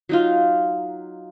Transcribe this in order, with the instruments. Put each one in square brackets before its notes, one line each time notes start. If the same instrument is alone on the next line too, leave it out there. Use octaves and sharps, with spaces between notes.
[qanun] F#3 D#4 F4